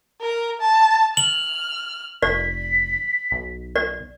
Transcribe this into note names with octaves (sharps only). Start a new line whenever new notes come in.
A#4
A5
F6 F#7
F1 D5 B6
B1
D5